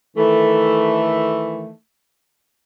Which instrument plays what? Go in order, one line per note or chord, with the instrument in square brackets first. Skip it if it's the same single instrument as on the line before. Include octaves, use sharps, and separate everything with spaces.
[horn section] D#3 E3 A3